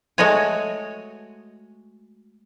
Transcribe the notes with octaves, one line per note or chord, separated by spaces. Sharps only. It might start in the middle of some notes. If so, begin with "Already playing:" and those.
G#3 A3 F#4 C#5 G#5